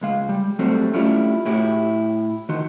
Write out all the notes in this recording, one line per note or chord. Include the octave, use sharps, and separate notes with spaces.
C#2 G#3 F5
G3
F#3 G3 A3 C4 F#4
A3 C#4 D4 E4 F4 G4
A2 E4 F#4 G4
D#3 D#4 F#4 C6